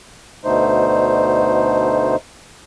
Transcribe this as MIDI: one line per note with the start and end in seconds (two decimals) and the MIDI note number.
0.45 2.16 38
0.45 2.16 47
0.45 2.16 50
0.45 2.16 57
0.45 2.16 63
0.45 2.16 72